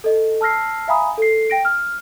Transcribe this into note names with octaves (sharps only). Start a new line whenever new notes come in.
A4 D#5
A5 E6 F6 A#6 C7
E5 F5 G#5 A#5 B5 D#6
A4 C7
G5 A#6 D7
F6